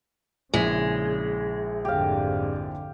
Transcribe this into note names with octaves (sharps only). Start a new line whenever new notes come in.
A#1 C#3 G#3 E4 B6
F2 G#2 D3 G4 F5